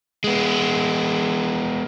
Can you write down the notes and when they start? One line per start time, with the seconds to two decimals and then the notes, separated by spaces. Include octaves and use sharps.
0.24 G#3 B3